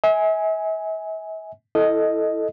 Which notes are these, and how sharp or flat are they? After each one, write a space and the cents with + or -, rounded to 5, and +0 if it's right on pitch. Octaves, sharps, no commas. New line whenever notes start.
E5 -40 G#5 +0
E4 +0 A4 +0 D#5 +0